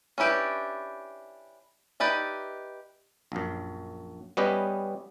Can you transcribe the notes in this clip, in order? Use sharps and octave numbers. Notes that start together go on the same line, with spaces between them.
C#4 D4 E4 G4 B4
D#4 G4 B4 D5 E5
A#1 F#2
G3 B3 C#4 G4 B4 D#5